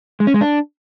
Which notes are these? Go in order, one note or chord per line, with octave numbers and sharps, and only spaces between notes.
G#3
C#4
G#3
D4